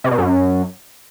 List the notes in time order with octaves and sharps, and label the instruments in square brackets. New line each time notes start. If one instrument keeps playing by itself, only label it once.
[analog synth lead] C3
B2
F#2